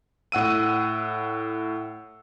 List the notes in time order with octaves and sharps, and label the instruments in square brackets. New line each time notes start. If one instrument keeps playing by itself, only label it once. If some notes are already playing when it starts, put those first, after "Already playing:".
[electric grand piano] A2 F#5 E6 D#7